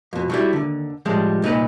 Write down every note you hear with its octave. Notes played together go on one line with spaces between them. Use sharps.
F2 B2
F#3 G3 E4
D#2 D3
A2 F3 G3 G#3
C2 A#2 D#4 B4